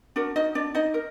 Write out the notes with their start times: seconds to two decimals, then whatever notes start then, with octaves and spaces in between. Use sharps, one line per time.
0.16 D4 F#4 A#4
0.36 D#4 D#5
0.55 D4 D5
0.75 D#4 D#5
0.94 A#4